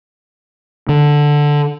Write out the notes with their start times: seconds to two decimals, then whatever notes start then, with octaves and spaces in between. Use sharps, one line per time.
0.89 D3